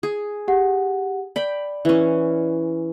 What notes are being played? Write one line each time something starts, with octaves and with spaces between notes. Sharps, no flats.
G#4
G4 F#5
D5 G5 B5
E3 C#4